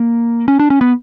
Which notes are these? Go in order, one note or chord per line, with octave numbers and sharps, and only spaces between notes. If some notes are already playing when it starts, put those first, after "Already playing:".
Already playing: A#3
C#4
D4
C#4
B3